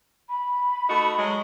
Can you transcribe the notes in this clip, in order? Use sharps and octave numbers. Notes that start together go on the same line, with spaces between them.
B5
A3 D#4 F#4
F#3 G#3